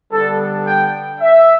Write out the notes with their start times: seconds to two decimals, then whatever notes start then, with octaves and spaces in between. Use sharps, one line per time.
0.13 D3 G3 B3 D4 A4
0.66 G5
1.20 E5